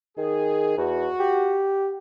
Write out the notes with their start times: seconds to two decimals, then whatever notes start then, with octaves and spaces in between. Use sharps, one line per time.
0.18 D#3 G#4
0.77 E2 F#4
1.20 G4